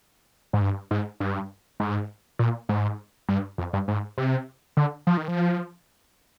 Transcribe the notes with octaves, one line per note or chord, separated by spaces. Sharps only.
G#2
G2
G#2
G2
G#2
A#2
G#2
G2
F2
G2
G#2
C3
D3
F3
D#3
F3